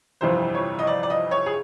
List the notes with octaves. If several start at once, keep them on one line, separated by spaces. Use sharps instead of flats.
G1 F2 C3 E3 C5
C#5
D#5
D5
D5
D#5
C#5
G#4